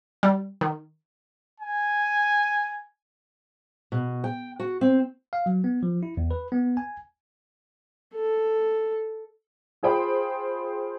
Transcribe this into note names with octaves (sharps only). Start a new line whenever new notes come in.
G3
D#3
G#5
B2
G5
F#4
C4
F5
F#3
B3
F3
E4
E2
B4
B3
G#5
A4
F4 G#4 C5 G5 B5